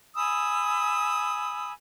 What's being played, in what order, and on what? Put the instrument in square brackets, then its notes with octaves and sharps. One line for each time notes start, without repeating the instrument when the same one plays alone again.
[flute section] G#5 B5 D#6 E6